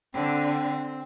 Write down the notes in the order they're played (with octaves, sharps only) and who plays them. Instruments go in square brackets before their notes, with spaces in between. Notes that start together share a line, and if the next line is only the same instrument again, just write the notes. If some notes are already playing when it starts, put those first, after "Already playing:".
[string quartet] D3 [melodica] C4